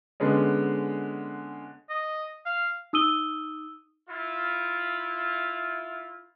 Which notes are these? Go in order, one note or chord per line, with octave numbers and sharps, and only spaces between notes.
D3 G#3 B3 C#4
D#5
F5
D#4 D#6 E6 D#7 G7
E4 F4